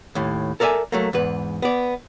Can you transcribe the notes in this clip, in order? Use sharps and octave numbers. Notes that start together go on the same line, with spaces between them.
D#2 A2
A4 A#4 D5 E5 G#5
F#3 A3 A#3
E2 G#2 B4
B3 D5